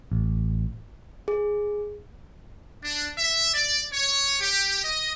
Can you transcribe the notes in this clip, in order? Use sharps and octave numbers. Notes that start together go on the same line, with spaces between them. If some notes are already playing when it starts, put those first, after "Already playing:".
A1
G#4
D4
E5
D5
C#5
G4
D#5